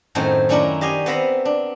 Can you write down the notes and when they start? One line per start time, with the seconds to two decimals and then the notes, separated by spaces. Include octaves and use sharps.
0.15 F#2 A2 D#3 A3 C4 C5
0.49 D#3 F#3 C#4 D4 E4 A#4
0.81 G4 D#5 F5 G#5
1.06 B3 C4 E5 F5 A#5 B5
1.45 D4